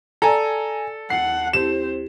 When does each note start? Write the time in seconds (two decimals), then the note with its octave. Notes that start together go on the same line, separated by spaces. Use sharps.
0.22 A4 D5 G#5 A#5 E6
1.10 D#2 F#5 C7
1.53 C4 E4 G4 C5 E7